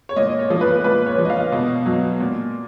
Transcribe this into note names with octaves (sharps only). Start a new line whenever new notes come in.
C#5
A#2 D#5
C#5
F3
B4
A#2 B4
C#5
F3
D#5
F5
B2
F#3
A#2